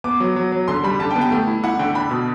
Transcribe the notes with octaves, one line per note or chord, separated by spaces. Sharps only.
B3 D6
F#3
F#3
F#3
D3 C6
G3 B5
D3 A5
G5
B3
G5
A3
E4
E4 F#5
D3 G5
D4 B5
B2